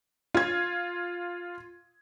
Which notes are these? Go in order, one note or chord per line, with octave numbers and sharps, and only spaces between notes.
F4 G#6